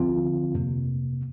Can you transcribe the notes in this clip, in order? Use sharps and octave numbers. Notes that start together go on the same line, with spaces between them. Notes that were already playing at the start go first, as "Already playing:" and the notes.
Already playing: D2 D3 F3 C4 F4
F2 C3 A#3